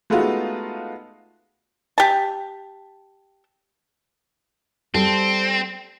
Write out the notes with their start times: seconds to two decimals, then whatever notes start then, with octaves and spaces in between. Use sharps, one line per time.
0.10 G#3 A3 B3 D#4 F4 F#4
1.98 G4 A5
4.94 G3 C4 A4